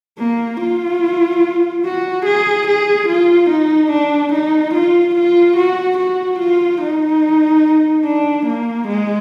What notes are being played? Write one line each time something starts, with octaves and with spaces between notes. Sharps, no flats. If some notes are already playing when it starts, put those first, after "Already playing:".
A#3
F4
F#4
G#4
G#4
F4
D#4
D4
D#4
F4
F4
F#4
F#4
F4
D#4
D4
A#3
G#3